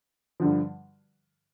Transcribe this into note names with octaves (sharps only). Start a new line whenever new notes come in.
G2 D3 F3